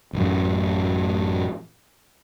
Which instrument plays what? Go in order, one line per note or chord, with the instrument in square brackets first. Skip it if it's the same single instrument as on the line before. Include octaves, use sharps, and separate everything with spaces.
[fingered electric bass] A1 F#2